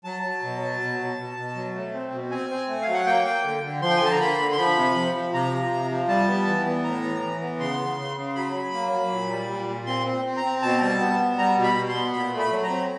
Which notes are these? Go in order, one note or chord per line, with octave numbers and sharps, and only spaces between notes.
F#3 A5
F#3
B2
F#3
B2
B2
B2
B2
F#3
A3
C4
B2
C4 G#5
C4
A3
F5
F#3
F#5
A#3 G5
A#3
D3
D3
F3 C6
G5
G#5
D3 A5
A#5
A#3 B5
D3
C6
F3 B5
C3
F3
F3
C3 A#5
F3
C3
F3
G3 A5
B3
E3
B3
A2 A#5
E3
E3
B3
C#3 C6
C#3
C#3
C#3
F#3 B5
F#3
A#3
F#3
A#2
G3
A#2
A#2
C4 C6
C4
C4
A#5
C4
B2 A5
G3
B3
B3
G3 A#5
B2
B5
B2
C6
B3
A#2 B5
A3
B5
F#3
A#5
C4